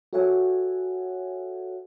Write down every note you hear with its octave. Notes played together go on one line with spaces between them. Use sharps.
F#4 A4 C#5 E5 F#5 G#5